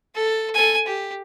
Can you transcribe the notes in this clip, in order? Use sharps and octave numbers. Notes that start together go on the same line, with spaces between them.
A4
A4 G#5
G4